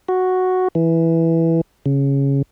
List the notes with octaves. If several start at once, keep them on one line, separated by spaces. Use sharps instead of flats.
F#4
E3
C#3